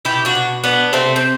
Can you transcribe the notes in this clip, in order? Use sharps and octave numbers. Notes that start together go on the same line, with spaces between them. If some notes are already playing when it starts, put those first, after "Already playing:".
B2 E4 G4
D4 F#4
B2
A3 B3 D4
C3 A3 C4
C4